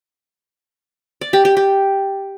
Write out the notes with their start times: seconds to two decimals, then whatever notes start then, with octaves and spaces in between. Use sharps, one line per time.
1.21 D5
1.33 G4
1.45 G4
1.57 G4